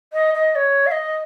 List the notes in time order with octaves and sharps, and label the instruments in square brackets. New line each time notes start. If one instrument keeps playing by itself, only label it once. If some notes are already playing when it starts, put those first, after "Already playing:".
[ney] D#5
D#5
C#5
F5
D#5